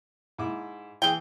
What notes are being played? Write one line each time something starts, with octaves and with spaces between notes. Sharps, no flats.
G#2 E4 D6
E3 G#4 G5